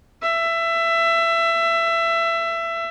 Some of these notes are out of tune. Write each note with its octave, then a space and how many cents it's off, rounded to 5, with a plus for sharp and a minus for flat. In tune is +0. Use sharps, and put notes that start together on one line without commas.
E5 +20